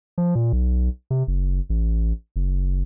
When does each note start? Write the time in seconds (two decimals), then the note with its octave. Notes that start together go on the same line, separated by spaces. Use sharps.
0.18 F3
0.35 A#2
0.53 B1
1.10 C3
1.27 F#1
1.70 A1
2.36 F#1